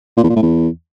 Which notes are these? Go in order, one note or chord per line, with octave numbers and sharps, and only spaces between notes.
A#2
E2
A#2
A2
E2